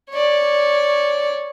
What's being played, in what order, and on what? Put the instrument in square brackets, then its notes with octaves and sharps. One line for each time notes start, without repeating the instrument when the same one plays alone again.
[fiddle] C#5 D5